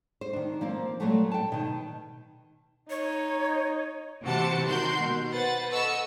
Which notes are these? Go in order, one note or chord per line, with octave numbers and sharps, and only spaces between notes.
C5
D#3 D4
F3 A#3 C4
A#2 E3 F#3 G3 A3 B3
G5 A5
B2 D#3
D#4 C#5
C3 E3 F#4 C5 A5 C#7
D#3 F#4 A#4 C6 G6
B2
B4 C5 F#5 A6
A4 D#5 F#5 B5 C#6 E6